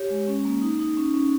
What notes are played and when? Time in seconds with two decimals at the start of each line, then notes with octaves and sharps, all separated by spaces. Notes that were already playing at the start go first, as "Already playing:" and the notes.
Already playing: G4 C#5
0.10 G#3
0.27 C#4
0.45 A#3
0.62 D#4
0.79 D#4
0.97 C#4
1.14 C#4